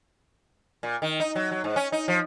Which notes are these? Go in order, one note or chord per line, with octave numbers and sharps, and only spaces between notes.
A#2
D#3
D#4
F#3
F#3
G#2
C#4
D#4
F3